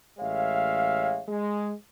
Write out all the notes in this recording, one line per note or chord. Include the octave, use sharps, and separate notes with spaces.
A1 G#3 C#5 E5 F5
G#3